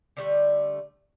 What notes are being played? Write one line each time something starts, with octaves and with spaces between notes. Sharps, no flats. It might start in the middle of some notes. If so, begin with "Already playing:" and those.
D3 G3 A3